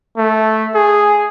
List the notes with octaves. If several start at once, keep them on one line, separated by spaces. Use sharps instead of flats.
A3
G#4